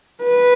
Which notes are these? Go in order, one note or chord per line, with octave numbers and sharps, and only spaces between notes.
B4